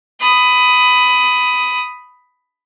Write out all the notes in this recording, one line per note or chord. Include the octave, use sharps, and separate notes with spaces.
B5 D#6